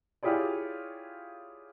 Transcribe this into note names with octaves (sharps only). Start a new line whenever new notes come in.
E4 F4 G4 G#4 C#5 D5